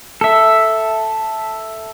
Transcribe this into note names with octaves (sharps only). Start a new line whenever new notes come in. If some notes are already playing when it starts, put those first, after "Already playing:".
A4 E5